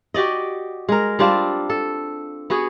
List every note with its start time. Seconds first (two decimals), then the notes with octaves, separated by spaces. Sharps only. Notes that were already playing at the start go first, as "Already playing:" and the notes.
0.14 F#4 G4 D5 D#5
0.89 G#3 A#4
1.19 G3 C4 D4 F4
1.70 A4
2.50 B3 F#4 G#4